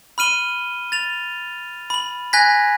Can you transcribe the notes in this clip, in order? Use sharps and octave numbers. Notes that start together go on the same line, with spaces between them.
B5 F6 D#7 G7
A6 F7
B5 F#7
G#5 F#6 G#6 A#6 B6